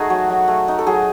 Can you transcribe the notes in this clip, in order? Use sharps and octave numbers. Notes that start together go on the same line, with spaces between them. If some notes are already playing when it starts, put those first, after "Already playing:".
Already playing: A3 D#4 F#4 G#4
F#3
F#3
A3
D#4
A4
F#3 G#4